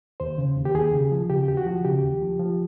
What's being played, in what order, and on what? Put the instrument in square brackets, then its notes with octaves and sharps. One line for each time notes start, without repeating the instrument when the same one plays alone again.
[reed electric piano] D#2 C5
C#3
D#2
G4
D#2 G#4
C#3
F3
C#3 G4
D#2 G4
F#4
F3
C#3 G4
D#2
F3
F3